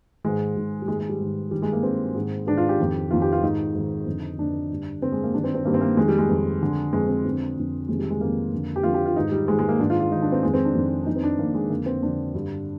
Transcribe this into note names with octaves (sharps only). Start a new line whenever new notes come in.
G#2 D#3 G#3
G#2 D#3
G3
G#2 D#3 G#3
G#3
G3
G#2 D#3
G2 D#3 G3
G#3
A#3
G2 D#3 C4
G#2 D#3
G#2 D#3 D4
F4
G4
F2 D#3
F2 D#3 F4
G4
F4
G#2 D#3 D#4
G#2 D#3
F2 D3
F2 D3 D4
G2 D3
G2 D3 C4
G#3
A#3
G2 D#3 D4
C4
C4
G2 D#3 A#3
C4
A#3
F2 D#3 G#3
G3
G#3
F2 D#3
F2 D3
F2 D3 G#3
C4
F2 D3
F2 D3
F2 C3 D#3 G#3
G3
G#3
F2 C3 D#3 A#3
F2 D3
G4
F2 D3 F4
G4
F4
G#2 D#3 D#4
G3
G#2 D#3 G#3
G#3
A#3
G#2 D#3 D4
F4
F4
G#2 D#3 D#4
D4
C4
F2 D#3 G#3
C4
D4
F2 D#3
D4
F2 D#3 D#4
C4
D4
F2 D#3 A#3
G#3
F2 D3 A#3
C4
F2 D3 D4
G2 D3